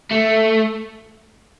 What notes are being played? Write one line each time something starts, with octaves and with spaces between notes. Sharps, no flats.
A3